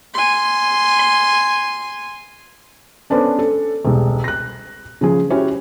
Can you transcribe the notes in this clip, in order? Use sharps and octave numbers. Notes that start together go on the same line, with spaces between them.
G#5 C6
B3 C#4 D4 A4 B4 C5
A4
E1 C2
F#6 A#6
C#3 F3 G#4
C#4 E4 F#4 G4 C#5